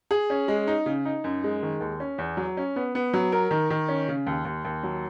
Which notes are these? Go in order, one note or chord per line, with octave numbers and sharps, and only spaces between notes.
G#4
C#4
G#3
D#4
C#3
D#4
F#2
G#3
D#3
D#2
C#4
E2
F#3
C#4
B3
B3
F#3
A#4
D#3
D#3
C#4
C#3
D#2
D#2
D#2
F#3